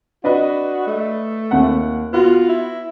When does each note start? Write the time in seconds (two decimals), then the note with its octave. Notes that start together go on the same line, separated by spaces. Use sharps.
0.24 D4 F#4 B4 D#5
0.87 A3
1.51 D#2 F#5
2.13 B3 F4 F#4
2.49 E4